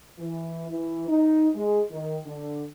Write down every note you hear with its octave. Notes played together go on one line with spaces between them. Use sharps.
E3
E3
D#4
G#3
D#3
D3